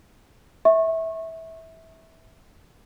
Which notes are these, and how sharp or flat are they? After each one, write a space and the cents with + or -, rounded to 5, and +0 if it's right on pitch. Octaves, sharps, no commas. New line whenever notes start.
E5 -20 C#6 -30